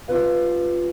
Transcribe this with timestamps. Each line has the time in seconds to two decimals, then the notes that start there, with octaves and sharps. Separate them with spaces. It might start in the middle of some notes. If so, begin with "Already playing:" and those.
0.08 G2 C#4 F4 G#4 B4 F5